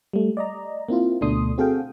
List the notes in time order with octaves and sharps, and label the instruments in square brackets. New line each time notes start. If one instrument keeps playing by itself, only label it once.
[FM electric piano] G3 A3
D5 D#5 A#5
A#3 C4 E4 F4
D2 B2 A3 D4 C6 D#6
C4 F#4 G#4 A4 F5 G5